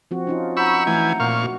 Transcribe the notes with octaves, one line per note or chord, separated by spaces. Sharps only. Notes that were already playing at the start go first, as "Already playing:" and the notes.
F3 C4 F#4
C#4 D#4 F4
F#5 A#5 B5 C#6 E6 G6
E3 A3 G#5
A#2 F5 C#6
F#4